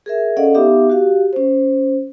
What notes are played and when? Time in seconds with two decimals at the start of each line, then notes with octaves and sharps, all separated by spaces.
0.06 G#4 A#4 E5
0.37 C#4 A4 D5 D#5 F5 F#5
0.54 B3 D#4 G4 E5 F5 D6
0.90 F#4 G4 F5
1.33 C#4 C5